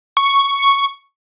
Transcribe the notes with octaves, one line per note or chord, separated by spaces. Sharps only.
C#6